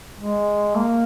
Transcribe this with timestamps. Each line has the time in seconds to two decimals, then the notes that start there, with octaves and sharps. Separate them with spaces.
0.17 G#3
0.75 A#3